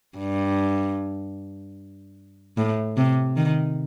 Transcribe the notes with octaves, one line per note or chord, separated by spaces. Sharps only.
G2
A2
C3
D#3